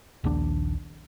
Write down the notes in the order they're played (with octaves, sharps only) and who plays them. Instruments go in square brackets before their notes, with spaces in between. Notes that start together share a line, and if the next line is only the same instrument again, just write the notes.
[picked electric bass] A#1 D#2 D4